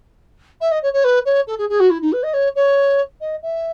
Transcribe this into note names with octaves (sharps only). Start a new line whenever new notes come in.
E5
D#5
C#5
C#5
B4
C#5
A4
G#4
G#4
F#4
E4
D#4
B4
D#5
C#5
C#5
D#5
E5